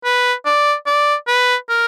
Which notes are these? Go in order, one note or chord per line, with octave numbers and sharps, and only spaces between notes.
B4
D5
D5
B4
A#4